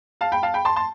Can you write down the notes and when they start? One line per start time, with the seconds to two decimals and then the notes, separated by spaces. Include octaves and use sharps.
0.21 F5 A5
0.32 G5 B5
0.43 F5 A5
0.54 G5 B5
0.65 A5 C6
0.76 A5 C6